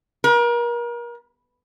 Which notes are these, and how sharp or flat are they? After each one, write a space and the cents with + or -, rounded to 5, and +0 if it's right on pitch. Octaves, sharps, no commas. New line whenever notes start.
A#4 +35